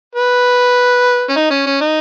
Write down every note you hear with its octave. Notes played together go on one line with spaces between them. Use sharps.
B4
C#4
D#4
C#4
C#4
D#4